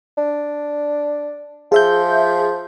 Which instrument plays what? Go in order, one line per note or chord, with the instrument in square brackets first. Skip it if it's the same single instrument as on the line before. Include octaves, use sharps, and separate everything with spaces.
[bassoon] D4
[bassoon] F3 [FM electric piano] G#4 E5 G6